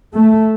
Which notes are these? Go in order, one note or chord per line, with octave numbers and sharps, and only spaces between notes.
A3